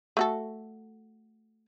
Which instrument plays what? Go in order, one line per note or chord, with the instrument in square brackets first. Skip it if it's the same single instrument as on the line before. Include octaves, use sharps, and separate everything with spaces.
[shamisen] A3 F#4 A4